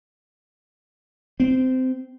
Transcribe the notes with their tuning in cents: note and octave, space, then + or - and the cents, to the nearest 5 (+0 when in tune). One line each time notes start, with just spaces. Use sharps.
C4 -20